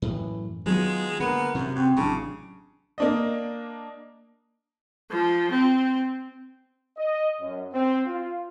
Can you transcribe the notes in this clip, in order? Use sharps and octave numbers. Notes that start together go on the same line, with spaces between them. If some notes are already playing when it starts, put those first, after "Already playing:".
F#2 A2 E3
D#3 F#3 G#3 B3 F4
D3 A#3 B3 A#4
F#2 C3
F#2 C4
A1 C#3 F#3 D4
A#3 D4 D#5
F3
C4
D#5
F#2
C4
F4